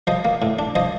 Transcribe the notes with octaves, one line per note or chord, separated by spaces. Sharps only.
F3 C5 D#5
A#3
A2
D4
F3 C5 D#5